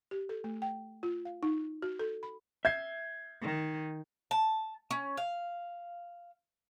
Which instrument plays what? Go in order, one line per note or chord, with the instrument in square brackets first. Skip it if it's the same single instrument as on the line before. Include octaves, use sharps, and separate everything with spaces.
[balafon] G4
A4
A3
G5
F4
F5
D#4
F#4
A4
B5
[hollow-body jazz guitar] E5 [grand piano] G6 G#6 C7
[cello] D#3
[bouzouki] A5
C#4
F5